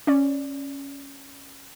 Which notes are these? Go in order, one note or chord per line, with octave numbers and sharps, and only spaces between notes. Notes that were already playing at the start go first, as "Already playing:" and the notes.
C#4 D5